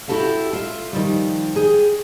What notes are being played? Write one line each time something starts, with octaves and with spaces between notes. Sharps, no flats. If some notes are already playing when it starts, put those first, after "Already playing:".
E4 F#4 G4 A4 E5 F5
F4 E5
D#3 F3 G3
G#4 G5